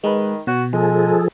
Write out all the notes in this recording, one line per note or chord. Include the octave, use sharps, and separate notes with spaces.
D#3 G#3 B4
B2 F#4
F3 G#3 G#4 A4